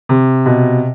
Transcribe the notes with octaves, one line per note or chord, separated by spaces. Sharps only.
C3
B2